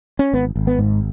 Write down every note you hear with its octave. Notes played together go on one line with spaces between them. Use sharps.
C#4
G#1 B3
G#1
B3
G#2